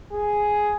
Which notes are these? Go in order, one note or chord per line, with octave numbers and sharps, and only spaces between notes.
G#4